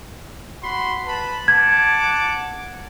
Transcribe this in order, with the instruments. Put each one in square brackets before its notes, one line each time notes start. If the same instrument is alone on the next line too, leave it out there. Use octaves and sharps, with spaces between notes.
[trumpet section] F#4 B5 C6
B4 A5 B5
[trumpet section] F#5 A5 D6 [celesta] G#6